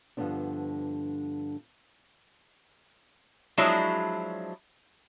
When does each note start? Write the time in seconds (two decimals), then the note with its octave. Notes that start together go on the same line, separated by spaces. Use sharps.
0.17 G2 D3 F3 B3 C4 D4
3.58 F3 F#3 G#3 D4 E4